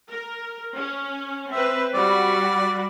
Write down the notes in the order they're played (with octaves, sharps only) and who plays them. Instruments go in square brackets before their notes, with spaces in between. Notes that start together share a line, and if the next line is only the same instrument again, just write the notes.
[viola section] A#4
C#4
[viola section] C4 B4 [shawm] E5
[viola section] G3 F#4 B5 [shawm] D5